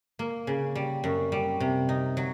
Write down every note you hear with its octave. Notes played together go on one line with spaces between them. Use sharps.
A#3
C#3
G3
F#2
G3
C3
D#4
F#3